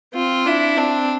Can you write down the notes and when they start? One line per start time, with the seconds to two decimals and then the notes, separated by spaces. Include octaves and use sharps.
0.14 C4 F4
0.46 D4 E4
0.77 C4 D4